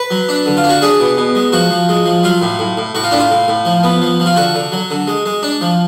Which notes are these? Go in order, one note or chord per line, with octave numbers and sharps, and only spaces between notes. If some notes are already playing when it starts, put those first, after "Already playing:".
Already playing: B4
F#3
D4
D3
F4
D4
F#4
D4 G#4
B2
B2
G#3
F3 F#4
F3
G#3
F3
F#3 F4
A2
A2
A2
A2 F#4
F4
A2 D4
F4
A2
A2
F3
B3
F3
F3
F4
D3 F#4
D3
F#3
D3
G#3
G#3
D4
F3